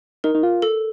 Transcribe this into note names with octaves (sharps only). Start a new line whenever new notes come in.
D#4 A#4
D#4
F4
A4